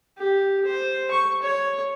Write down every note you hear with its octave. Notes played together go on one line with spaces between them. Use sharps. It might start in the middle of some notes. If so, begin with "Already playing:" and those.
G4
C5
C#6
C#5